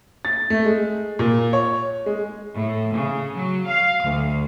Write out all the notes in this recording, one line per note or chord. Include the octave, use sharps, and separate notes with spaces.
A6
A3
G#3
A#2
C#5
G#3
A2
C#3
F#3
F5
D2